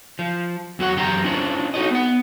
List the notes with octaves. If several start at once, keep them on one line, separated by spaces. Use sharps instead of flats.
F3
E2 F#3 F#4 F#5
F#2 E3 G4 G5 A#5
C#4 D4 E4 F4 C5
D#4 F#4 C#5 D#5
B3 F#5